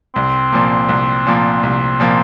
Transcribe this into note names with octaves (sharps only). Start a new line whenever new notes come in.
C2 C4
A#2 F3 A#3
C2
A#2 F3 A#3
C2 C4
A#2 F3 A#3